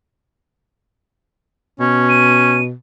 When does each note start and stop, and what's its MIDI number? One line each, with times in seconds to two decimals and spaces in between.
1.80 2.73 47
1.80 2.57 61
2.09 2.63 99